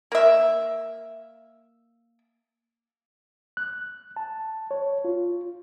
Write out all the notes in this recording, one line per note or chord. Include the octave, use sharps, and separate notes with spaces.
A#3 E5
F#6
A5
C#5
F4